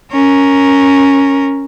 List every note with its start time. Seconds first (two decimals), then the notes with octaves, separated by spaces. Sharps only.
0.12 C#4 A#4